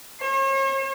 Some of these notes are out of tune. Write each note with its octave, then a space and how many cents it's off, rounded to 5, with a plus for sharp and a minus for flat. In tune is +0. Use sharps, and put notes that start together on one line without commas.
C#5 -45